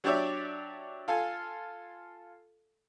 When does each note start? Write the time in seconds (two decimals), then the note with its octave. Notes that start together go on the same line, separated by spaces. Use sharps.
0.04 F#3 D4 G4 C#5 D5 E5
1.08 F4 A4 F5 G#5